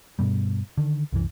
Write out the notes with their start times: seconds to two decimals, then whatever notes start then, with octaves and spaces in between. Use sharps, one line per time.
0.19 G2 B2 G3
0.78 D3 D#3
1.12 C2 F#2 E3